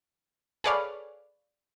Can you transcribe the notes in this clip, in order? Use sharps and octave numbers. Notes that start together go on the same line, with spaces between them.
G#4 A4 B4 C#5 D5 F5